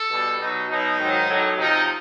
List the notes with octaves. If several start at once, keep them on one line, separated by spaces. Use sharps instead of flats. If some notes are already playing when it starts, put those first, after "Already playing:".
Already playing: A4
B2 G3
B2 F#3 D#4
B2 F#3 D#4
G#2 D#3 F#3
A2 F#3
C3 F3 D#4